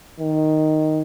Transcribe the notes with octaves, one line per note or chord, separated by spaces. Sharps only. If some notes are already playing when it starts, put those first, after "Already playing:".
D#3